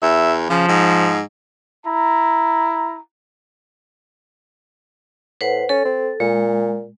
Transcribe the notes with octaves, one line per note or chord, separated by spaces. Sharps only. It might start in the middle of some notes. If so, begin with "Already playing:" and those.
E2 E5
C#3 F3
G#2
E4 A#5
A2 B4 C5 F#5
C#4 A4
C4
A#2 G#3